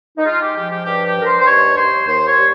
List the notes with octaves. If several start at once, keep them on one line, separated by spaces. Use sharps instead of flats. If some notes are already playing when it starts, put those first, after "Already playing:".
D#4
G#3 F4
G4
F3 G4
G4
G2 G4
G4
G2
A#4
C5
C5
D#2 C#5
D#2 C5
D#2 C5
C#5
G3